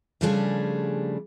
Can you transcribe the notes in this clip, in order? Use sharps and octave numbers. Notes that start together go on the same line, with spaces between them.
C#3 F3 G3 A3 D4 G#4